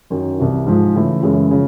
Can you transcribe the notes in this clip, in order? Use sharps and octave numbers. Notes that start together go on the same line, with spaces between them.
F#2 D#3 F#3
C2 C3 E3
G#2 F3 G#3
C#3 E3 A3
F#2 C#3 E3 G#3 C#4
C#3 F3